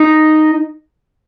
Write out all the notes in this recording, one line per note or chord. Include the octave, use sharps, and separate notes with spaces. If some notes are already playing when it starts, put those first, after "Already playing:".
Already playing: D#4